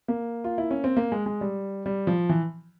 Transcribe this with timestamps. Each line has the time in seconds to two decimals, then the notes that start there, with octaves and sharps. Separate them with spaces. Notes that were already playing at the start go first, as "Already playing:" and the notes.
0.08 A#3
0.44 F4
0.58 E4
0.71 C#4
0.84 C4
0.97 A#3
1.12 G#3
1.26 G#3
1.41 G3
1.86 G3
2.07 F3
2.29 E3